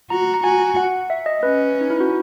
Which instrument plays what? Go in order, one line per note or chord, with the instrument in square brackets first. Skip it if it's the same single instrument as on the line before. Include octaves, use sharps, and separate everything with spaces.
[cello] F#4 [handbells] A#5
[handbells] A#5
[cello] F#4 [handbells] G#5
[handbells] F#5
E5
D#5
[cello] C#4 [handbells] B4
[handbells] D#4
E4
F#4